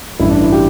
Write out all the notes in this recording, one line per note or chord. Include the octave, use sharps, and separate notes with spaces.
A1 G2 E3 E4
D4
E4
G4